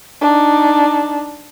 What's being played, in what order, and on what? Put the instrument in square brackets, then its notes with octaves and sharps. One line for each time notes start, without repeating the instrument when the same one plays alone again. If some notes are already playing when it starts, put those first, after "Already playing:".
[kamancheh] D4 D#4